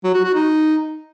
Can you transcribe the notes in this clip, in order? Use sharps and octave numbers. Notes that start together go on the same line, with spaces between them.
F#3
F#4
F#4
D#4